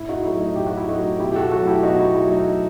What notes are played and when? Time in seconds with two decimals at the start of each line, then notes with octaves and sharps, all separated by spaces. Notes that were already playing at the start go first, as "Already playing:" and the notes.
Already playing: A2 E4
0.09 D#4 F#4
0.24 F#3 A3 E4
0.40 D#4
0.56 A2 G4
0.67 F#4
0.77 E4
0.88 F#3 A3 D#4 F#4
1.20 B2 E4 G4
1.31 G4
1.35 F#4 A4
1.52 F#3 A3 F#4 A4
1.67 E4 G4
1.83 B2 D#4 F#4
2.00 E4
2.15 F#3 A3 E4
2.32 D#4